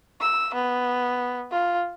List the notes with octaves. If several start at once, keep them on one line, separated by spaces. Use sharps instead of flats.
E6
B3
F4